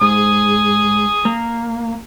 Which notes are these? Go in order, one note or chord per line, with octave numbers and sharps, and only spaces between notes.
G#2 G#5 D#6
A#3